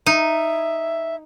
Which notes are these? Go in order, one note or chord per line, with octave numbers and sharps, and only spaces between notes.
D#4 E5